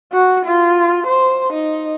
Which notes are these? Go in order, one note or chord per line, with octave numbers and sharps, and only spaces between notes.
F#4
F4
C5
D#4